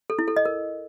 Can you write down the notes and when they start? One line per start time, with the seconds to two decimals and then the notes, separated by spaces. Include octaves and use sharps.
0.10 A4
0.19 E4
0.28 A4
0.36 D#5
0.45 A#4